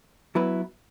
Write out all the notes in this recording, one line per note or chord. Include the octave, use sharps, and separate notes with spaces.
F#3 B3 E4 B4